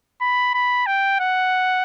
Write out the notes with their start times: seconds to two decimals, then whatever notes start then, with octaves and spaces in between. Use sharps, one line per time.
0.21 B5
0.54 B5
0.87 G5
1.20 F#5